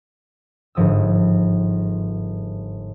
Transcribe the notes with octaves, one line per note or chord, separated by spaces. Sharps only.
G1 G#2 F3 D#6 E6